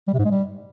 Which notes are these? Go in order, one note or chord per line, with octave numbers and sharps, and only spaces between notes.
G3
C3
G#2
G#3
G3